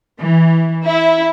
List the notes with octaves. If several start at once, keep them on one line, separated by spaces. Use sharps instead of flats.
E3
E4